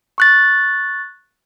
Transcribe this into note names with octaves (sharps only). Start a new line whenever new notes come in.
C#6 F#6 A6